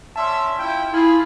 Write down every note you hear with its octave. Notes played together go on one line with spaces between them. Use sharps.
C#4 D5 E5 A5 C6
E4 F4 G5
E4 F4 G#4